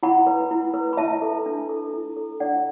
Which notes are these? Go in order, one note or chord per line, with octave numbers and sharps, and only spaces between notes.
E4 F#5 B5
B4
E4
B4
B5
E4 E5 A5
A4
D4
A4
E4
A4
D4 D5 F#5